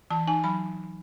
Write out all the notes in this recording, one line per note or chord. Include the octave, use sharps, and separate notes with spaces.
E3 A5
D#4 G#5
F#3 B5